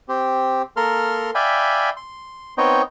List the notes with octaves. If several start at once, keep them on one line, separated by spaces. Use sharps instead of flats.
C4 G4
A#3 A4 A#4 C6 F6
D5 E5 F5 G5 G#5 B5
C6
B3 C4 D#4 C#5 D#5 G5